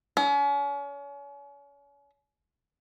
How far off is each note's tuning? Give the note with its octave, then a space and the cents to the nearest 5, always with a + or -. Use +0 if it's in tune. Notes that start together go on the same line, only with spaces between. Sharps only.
C#4 +35